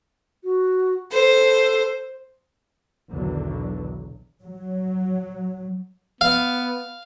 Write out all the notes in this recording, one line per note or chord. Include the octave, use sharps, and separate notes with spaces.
F#4
A4 C5
B1 E2 D3 D#3 F#3
F#3
B3 F5